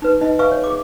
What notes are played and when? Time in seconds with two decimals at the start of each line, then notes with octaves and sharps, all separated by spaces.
0.02 D#4 B4
0.21 D#4 D#5
0.39 B4 E5 F5 G#5 C#6
0.52 C#5
0.64 G#4 D6